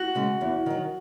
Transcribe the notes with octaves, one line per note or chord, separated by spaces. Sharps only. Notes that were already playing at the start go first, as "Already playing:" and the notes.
Already playing: F#4
C#3 G#3
E2
D#3 F#3